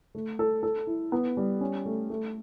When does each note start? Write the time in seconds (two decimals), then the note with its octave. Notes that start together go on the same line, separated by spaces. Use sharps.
0.15 A3
0.39 A4
0.63 A4
0.87 E4
1.12 B3
1.37 G3
1.61 C#4
1.86 A3
2.10 A3